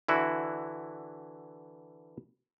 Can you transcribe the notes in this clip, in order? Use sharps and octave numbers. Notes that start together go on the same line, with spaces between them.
D3 E3 E4 F#4